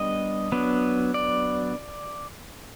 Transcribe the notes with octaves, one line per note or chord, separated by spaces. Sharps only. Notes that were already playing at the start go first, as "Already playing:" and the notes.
Already playing: G3 B3 D4 D#5
F#3 B3 D4
D5